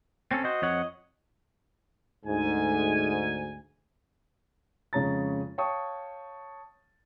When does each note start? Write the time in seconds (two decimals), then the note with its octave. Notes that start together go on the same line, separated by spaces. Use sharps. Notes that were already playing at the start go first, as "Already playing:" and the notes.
0.31 C4 C#4 A4
0.44 F#4 C5 D#5
0.62 F2 C#5 F#5
2.25 D2 G#2 G#5
4.93 F2 C#3 G#3 C#5 A#5 A6
5.58 C#5 F5 G5 A5 C#6 D#6